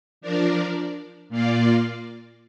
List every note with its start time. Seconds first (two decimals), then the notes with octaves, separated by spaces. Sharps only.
0.21 F3 D4 A#4 D5
1.29 A#2 A#3 F4 D5 F5